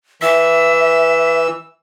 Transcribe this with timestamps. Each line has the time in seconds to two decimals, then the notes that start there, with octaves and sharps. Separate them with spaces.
0.22 E3 E5 E6